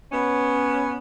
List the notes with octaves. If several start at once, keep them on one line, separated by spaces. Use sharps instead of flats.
B3 C#4